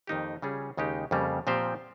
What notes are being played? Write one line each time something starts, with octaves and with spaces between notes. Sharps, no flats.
F2 D#3 A#3 D#4 G4
C#3 G3 C#4 F4 G#4
D#2 C#3 G#3 D#4 G4
F2 C#3 G3 A#3
A#2 F3 C4 G4 C5